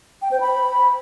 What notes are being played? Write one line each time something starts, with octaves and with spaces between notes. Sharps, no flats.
G5
C5
B5